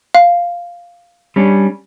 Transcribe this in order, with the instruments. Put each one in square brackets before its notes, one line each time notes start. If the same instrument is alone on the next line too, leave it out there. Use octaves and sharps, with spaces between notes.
[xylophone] F5
[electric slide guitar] G3 C#4 D4